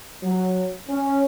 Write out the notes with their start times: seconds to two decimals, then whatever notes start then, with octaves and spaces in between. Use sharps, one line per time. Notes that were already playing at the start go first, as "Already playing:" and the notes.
0.23 F#3
0.89 C#4